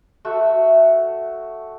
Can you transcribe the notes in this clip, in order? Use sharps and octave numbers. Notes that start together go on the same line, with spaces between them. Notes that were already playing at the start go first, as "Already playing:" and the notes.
A3 F#4 E5 F#5